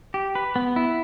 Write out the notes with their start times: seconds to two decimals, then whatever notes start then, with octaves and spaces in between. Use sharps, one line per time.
0.14 G4
0.35 B4
0.56 B3
0.76 E4